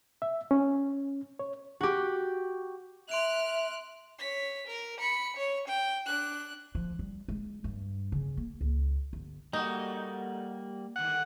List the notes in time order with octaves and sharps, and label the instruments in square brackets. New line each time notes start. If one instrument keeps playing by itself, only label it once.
[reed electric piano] E5
C#4
C#5
[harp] F#4 G4
[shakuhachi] E5 [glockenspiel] C6 D7 F7 [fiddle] F6 F#6
[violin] C#5 B6
A#4
B5 C#7
C#5
G5
D4 F#6
[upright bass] F3
G3
G#3
G2
C#3
A#3
C#2
G1
[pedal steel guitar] G3 A#3 [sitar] A3 F#4 [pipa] D#4
[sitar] G#2 D3 D#3 [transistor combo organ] F#5